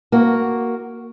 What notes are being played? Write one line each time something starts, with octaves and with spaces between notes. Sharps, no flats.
A#3 F#4